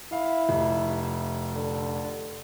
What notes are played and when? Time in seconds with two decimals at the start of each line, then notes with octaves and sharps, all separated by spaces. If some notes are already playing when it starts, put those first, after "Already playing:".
0.12 E4 F5
0.49 F1
1.54 D3